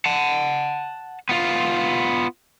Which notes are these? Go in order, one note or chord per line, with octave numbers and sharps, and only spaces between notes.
F#5 A5
B3 F4